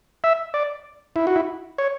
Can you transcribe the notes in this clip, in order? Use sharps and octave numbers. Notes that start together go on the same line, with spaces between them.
E5
D5
E4
F#4
E4
C#5